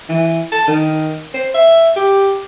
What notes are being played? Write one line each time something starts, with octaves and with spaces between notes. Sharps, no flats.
E3
A5
D#3
C5
E5
G4